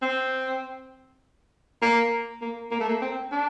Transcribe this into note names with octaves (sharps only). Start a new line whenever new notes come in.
C4
A#3
A#3
A#3
A3
A#3
C4
D4